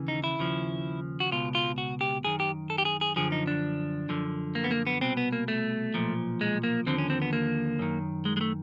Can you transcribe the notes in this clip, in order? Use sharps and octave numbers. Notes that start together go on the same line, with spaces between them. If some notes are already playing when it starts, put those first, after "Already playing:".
Already playing: D#2 C#3 E3
D#4
E4
D#2 C#3 F3
F#4
C#2 B2 F4
F4
F#4
G4
F#2 D#3 G#4
G4
A4
G4
G#4
G#4
F#2 D3 F3 G#4
D#4
D4
F#2 D3 F3
A#3
B3
A#3
B3
C2 B2 C4
B3
A#3
A3
B1 A#2 F3
G#3
A#3
D#2 D3 F3 C4
C#4
C4
B3
A#3
F#2 D#3
G#3
G#3
A3